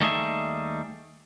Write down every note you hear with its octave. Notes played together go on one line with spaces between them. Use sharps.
D#2 G3 A3 D#4 G#4 E5